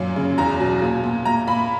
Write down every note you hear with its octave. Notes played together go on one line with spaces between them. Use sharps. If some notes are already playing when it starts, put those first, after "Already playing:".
Already playing: F#2 A#2
C#3
E2 A#5
B2
A#2
A#2
A#2 A#5
A#2 B5